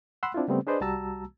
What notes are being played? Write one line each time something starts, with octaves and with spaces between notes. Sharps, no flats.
F#5 B5 C6 E6 F#6
C4 D4 E4 F4
C#3 G3 A3 B3 C4
D4 G#4 B4 C5 D5 D#5
C2 G3 F#4 A5 A#5 E6